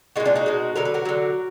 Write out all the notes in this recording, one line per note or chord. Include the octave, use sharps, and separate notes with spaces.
A#2 G#3 D#4 F#4
D4 F4
D#4 F#4
B2 G#3
D3 F#3 A#4
B4
F#4 A#4
D3 F#3